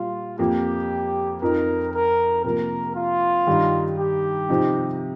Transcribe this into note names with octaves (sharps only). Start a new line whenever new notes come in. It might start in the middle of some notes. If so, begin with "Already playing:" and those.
Already playing: A#2 G3 F4
F2 F3 A#3 G4
F2 F3 D#4 A#4
A#4
C3 F3 A#3 A#4
F4
G2 D#3 G3 D#4
G4
C3 F3 C4 D#4